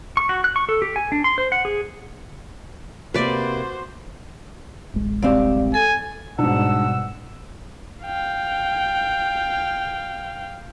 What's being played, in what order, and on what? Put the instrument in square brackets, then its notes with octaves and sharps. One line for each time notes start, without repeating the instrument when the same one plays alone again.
[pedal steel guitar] C#6
F#4
F#6
C#6
A4
G4
G#5
D4
C6
C5
F#5
G#4
[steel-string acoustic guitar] C3 A#3 [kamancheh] F#4 C5 [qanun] B4 D5
[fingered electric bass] D1 A1 G#3
[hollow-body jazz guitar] C2 C4 G4 [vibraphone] D5 F5
[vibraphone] A4 [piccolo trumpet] G#5
[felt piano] G#2 D4 [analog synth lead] B2 [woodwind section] G3 F#5 E6
[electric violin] F5 G5